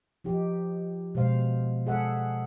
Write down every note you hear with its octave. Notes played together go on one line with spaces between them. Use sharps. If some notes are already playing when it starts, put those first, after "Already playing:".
F3 D#4 G4
B2 G#3 C5 F5
G#3 G#4 A4 E5 F#5